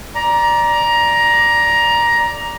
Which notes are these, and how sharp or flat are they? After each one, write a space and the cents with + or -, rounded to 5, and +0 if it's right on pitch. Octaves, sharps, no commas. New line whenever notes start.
D5 +0 A#5 +15